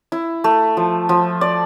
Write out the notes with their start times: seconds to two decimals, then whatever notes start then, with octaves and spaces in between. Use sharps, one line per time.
0.12 E4
0.44 A3
0.77 F3
1.09 F3
1.41 D5